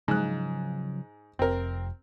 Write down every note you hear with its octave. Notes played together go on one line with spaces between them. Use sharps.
G#2 C#3 F3 F#3 F#6
F1 C4 A#4